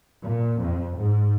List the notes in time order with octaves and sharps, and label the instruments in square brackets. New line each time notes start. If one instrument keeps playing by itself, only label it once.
[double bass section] A#2
F2
G#2